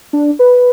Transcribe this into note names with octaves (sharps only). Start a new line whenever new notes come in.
D4
B4